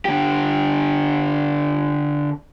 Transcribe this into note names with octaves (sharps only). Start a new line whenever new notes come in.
D3 G4